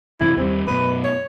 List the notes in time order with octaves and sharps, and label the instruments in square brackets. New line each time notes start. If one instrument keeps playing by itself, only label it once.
[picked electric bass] F#2 C3 E3 [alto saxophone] E4
[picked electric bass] D#2 G3 [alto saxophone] C4
[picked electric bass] F#2 B2 [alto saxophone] B4
[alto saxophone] C#5